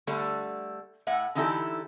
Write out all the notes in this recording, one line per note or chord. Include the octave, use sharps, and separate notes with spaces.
D3 G3 A3
A2 E5 F#5
D3 E3 D#4 E4 G4 A4